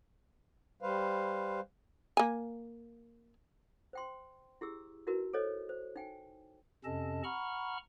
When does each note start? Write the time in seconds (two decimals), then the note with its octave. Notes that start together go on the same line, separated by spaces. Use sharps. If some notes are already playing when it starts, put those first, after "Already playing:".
0.82 G3 B4 C5 F5
2.17 A#3 G#5
3.93 C5 G5 C6
4.61 E4 G4 G#4 E6
5.07 D#4 E4 F#4 A#4 B4
5.33 A4 C5 C#5 D#5
5.69 C5
5.96 D#4 G5 G#5
6.84 F2 C3 C#4 A4 D#5 A5
7.24 F#5 A#5 B5 C#6 F6